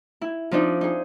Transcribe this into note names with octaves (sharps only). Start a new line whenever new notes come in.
E4
F3 C4 D4 D#4
D#4 G#4